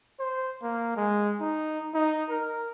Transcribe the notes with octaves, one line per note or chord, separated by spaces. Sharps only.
C5
A#3
G#3
D#4
D#4
A#4